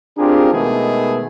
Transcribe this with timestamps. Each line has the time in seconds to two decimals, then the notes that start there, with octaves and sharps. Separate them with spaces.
0.18 C4 D4 F4 G4 G#4 A#4
0.53 B2 D#3 G#3 A3 B3 G#4